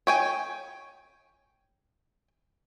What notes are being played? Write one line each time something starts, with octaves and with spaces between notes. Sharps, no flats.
C#5 G5 G#5